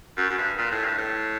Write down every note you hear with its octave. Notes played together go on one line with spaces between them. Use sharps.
F#2
F#2
G2
A#2
A2
G2
A2